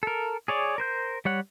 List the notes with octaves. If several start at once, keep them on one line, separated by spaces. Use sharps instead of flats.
A4 A#4
G#4 C#5 D5
A#4 C5 G6
G3 C#5 F#5